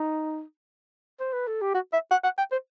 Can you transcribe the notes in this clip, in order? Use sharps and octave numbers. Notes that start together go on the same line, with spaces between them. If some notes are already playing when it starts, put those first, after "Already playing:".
Already playing: D#4
C5
B4
A4
G4
F#4
E5
F#5
F#5
G5
C5